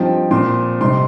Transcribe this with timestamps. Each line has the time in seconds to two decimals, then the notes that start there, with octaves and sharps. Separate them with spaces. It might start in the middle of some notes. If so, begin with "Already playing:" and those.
Already playing: G2 F3 C4 D#4 G5
0.31 A#2 F3 C4 C6
0.81 C3 G3 C4 D#4 C6